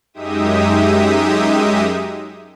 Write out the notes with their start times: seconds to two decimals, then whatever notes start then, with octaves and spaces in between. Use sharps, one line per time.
0.13 F#2 G#3 D#4 G4 E5 D#6